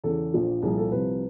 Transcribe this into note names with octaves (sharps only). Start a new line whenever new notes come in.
E2 C#3 E3 A4
A#1 A#2 F3
C2 A#2 F3 G#4
A4
C2 C3 F3 B4